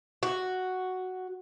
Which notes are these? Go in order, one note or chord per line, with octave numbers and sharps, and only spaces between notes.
F#4